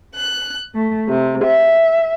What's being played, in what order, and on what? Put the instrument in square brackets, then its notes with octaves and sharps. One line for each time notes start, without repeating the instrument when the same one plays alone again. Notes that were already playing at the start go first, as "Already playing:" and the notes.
[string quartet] F#6
A3
C3
E5